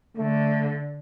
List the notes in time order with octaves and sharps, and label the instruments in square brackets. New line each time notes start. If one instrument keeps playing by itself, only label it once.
[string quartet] D3 [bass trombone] A3